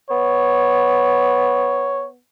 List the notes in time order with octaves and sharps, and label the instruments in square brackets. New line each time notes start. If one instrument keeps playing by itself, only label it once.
[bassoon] B3 [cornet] C#5